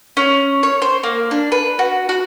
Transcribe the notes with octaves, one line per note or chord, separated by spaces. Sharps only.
C#4
C#5
C5
A#3
D4
B4
F#4
F#4